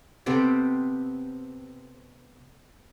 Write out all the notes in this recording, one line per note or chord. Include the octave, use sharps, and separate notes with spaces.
C3 B3 C4 A4